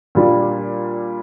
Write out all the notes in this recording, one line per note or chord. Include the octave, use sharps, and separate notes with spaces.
A#2 G3 D4 F4